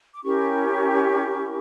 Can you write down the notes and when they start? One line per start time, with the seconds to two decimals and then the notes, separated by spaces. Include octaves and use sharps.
0.14 D6
0.23 C#4 E4 G4 A#4 C#6